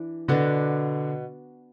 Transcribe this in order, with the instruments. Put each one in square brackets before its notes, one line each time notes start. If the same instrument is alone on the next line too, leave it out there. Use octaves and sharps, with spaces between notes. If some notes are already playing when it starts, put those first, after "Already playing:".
Already playing: [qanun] E3 D4
[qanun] B2 B3 D4 F#4 [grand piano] D3